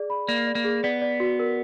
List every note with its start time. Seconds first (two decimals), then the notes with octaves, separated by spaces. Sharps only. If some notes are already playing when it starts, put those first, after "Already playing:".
Already playing: G#4 D5
0.10 B5
0.28 A#3 D5
0.47 D5
0.55 A#3
0.64 G#4
0.84 B3 D5
1.02 D5
1.20 F#4
1.39 A#4